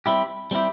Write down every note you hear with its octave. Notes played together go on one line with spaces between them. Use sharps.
G3 C4 E4 G4
G3 C4 E4 G4